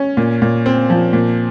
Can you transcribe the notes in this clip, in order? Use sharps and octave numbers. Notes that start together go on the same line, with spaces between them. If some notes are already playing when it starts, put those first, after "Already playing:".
Already playing: C#4
A#2
A#2
C4
F3
A#2